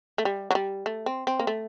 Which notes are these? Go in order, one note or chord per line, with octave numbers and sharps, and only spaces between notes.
A3
G3
F#3
G3
A3
C4
C4
A#3
A3